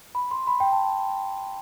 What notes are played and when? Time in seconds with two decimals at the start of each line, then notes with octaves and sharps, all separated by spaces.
0.15 B5
0.31 C6
0.47 B5
0.60 G5
0.72 A5